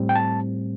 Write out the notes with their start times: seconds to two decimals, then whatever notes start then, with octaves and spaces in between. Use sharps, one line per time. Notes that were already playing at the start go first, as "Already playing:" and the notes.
Already playing: A2 G3 C4
0.09 G5
0.15 A5